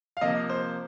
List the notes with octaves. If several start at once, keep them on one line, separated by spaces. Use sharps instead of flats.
F5
C3 F3 A#3 D#5
C5